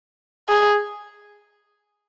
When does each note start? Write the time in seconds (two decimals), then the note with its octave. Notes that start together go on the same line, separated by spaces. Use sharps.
0.49 G#4